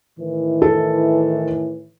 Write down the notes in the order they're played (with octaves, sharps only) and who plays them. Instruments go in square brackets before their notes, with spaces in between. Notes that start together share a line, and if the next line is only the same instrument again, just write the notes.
[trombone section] A2 D#3 E3
[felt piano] A4